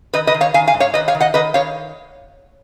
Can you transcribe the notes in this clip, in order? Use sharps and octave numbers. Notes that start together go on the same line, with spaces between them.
D#3 B4 D#5
B4 D#5
D#3
C#5 F5
D#3 F5 G#5
F5 G#5
G#2
C#5 F5
D#3 B4 D#5
C#5 F5
D#3
D#5 F#5
D#3 B4 D#5
D#3 C#5 F5